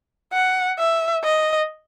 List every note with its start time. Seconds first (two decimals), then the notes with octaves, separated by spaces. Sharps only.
0.32 F#5
0.79 E5
1.24 D#5